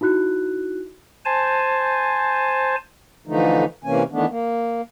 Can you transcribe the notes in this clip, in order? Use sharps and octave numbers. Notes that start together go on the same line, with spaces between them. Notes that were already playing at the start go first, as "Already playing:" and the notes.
D#4 E4 F#4 F#6
C5 G#5 A5
D3 E3 F3 A3 D#4
C3 E3 A#3 C#4 G#5
D#3 E3 A3 B3 D4
A#3